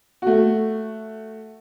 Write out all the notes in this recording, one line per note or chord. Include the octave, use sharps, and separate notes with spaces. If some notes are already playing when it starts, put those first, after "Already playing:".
A3 F#4